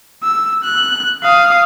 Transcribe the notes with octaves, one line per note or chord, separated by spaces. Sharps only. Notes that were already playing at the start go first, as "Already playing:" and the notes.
E6
F#6
F5 D#6